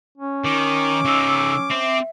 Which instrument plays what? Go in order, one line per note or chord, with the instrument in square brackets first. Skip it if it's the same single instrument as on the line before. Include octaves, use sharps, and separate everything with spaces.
[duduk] C#4
[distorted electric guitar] D#3 [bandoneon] D6
[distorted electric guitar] C#3 D#4 [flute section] E6
[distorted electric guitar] C4 [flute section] E5